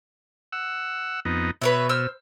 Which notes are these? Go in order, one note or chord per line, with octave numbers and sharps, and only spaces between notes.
F#5 E6
F2 B3 D#4
B2 B4 C#5 E5
C5 E6 F6